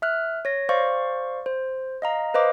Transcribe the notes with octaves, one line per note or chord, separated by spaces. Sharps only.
E5 F6 F#6
C#5 A#6
C5 D5 F5 C#6
C5
D#5 F5 A#5
B4 C5 D#5 F5 D6